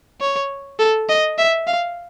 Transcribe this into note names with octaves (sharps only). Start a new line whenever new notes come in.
C#5
A4
D#5
E5
F5